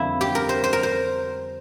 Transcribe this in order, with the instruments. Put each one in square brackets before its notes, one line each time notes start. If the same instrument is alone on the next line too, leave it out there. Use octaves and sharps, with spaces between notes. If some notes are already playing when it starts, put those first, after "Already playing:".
Already playing: [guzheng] F2 D3 G3 A#3 E4
G4
A#4
C5
C5
A#4
C5